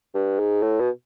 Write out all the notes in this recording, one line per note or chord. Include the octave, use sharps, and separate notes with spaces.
G2
G#2
A2
B2